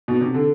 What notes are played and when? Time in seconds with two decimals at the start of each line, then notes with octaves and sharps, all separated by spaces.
0.08 B2
0.21 C3
0.34 D3